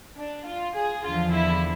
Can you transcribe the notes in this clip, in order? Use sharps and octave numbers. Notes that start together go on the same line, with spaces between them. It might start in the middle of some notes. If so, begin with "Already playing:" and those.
D4
F4
G#4
E2 D3 F3 F4
E4